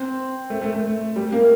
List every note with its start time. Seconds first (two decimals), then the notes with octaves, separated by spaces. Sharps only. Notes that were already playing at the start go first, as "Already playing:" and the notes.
Already playing: C4
0.50 A3
0.61 A3
0.73 A3
1.16 G3
1.32 A#3